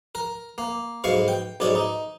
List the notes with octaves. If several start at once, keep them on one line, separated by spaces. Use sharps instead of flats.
A#4
A#3
B1 G#2 F5 C#6
G5
B1 G#2 C#4 D5
D#4